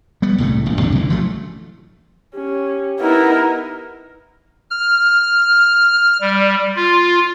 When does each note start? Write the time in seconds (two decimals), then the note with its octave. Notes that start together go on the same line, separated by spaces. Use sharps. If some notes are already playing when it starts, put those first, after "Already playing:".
0.22 G3 B3
0.38 C2 A2 C#3 A3
0.66 F1 A#1
0.80 D#2 C3 A3 D4
0.95 F#1 D3 E3
1.10 A1 F3 F#3 A3
2.35 C#4 G4
3.00 B3 D#4 E4 A#4
4.70 F6
6.21 G3
6.76 F4